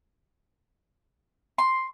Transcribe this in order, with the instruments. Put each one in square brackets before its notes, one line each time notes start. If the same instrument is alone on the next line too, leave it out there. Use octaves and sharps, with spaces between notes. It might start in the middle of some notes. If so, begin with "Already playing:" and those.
[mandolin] C6